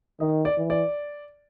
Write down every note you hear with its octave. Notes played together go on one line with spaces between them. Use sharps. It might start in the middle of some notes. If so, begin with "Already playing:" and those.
D#3 D#5
D5
E3
D5